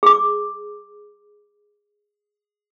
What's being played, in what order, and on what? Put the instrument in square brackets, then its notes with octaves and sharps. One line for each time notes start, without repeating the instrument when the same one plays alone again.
[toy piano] G#4 D6